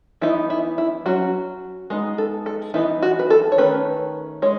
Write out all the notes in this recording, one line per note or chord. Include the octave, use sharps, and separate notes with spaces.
E3 B3 D#4 E4
E4
E4
F#3 C#4 F#4
G#3 B3 D#4
A4
A4
E3 B3 D#4 E4
F#4
B4
A4
C#5
D#3 A3 C#4 B4
G#3 C#5